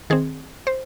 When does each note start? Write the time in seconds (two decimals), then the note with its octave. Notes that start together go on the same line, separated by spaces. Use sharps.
0.10 D#3 C4 G#4
0.67 C5